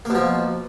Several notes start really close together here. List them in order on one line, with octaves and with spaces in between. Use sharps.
A#3 B2 F3